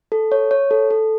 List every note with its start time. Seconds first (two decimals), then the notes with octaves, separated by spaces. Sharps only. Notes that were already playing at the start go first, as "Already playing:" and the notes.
0.12 A4
0.32 C#5
0.51 C#5
0.71 A4
0.90 A4